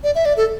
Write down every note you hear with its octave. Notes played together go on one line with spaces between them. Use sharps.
D5
E5
D5
A4